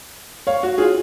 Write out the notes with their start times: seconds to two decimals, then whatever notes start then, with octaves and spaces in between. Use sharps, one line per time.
0.47 C#5 F5
0.63 F#4
0.78 F4 G#4